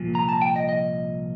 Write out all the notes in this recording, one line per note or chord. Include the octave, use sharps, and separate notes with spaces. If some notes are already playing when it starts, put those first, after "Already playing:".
Already playing: C2 A#2 F3
A#5
A5
G5
D#5
D#5